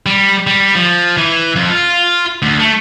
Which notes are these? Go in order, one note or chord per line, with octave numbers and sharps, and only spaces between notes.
G3
G3
F3
E3
F2
F4
D2
A3